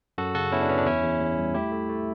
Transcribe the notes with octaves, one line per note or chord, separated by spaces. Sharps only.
F#2 F#4 A4
C#3 F#4 A4
B3 C#4 E4
D4
B3 C#4
D4
E2 C#4 E4
E2
E2
G3
A3 E4 G4
A3
A3